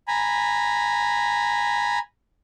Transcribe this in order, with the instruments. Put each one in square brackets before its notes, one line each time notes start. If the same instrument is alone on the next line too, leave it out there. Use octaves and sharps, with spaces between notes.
[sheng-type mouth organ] G#5 A#5 B5